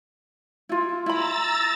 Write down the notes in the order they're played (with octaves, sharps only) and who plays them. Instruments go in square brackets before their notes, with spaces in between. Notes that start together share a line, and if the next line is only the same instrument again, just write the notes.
[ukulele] E4 F4
[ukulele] E4 B5 [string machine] A#5 E6 A6